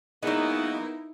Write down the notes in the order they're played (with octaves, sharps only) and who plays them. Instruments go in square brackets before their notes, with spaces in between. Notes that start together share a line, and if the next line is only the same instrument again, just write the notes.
[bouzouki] F#3 G#3 [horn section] A#3 B3 [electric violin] D#4 E4